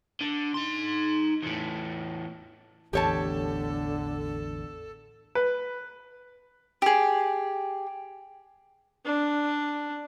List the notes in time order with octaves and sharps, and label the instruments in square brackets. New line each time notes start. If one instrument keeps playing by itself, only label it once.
[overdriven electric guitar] D3
D#4 C6
E2 A2
[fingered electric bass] A1 E2 [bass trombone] D3 [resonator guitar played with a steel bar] G4 C#5 A5 [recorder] A4
[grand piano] B4
[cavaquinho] G4 G#4
[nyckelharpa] D4